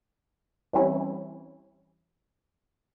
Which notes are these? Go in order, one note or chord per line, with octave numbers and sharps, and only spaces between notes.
E3 G3 C4 C#4 E4